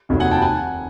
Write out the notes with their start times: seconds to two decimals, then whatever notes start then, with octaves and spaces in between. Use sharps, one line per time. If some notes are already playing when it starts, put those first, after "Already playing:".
0.09 F1 D#2 D#3 F#3
0.20 F#5 G#5
0.31 G5 A5
0.42 F#5 G#5